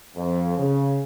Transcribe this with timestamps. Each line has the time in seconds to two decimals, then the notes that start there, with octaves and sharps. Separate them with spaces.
0.16 F2
0.57 C#3